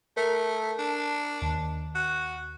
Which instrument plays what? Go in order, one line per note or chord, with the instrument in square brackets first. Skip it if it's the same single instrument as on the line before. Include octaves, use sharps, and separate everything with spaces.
[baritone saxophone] A3 [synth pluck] A#4
[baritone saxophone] D4
[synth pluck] D#2
[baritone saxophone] F#4